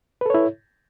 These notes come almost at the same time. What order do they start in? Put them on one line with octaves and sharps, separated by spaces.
B4 A4 C#5 E4